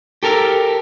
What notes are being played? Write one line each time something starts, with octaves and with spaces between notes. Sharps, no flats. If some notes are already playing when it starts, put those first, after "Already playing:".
G4 A4 A#4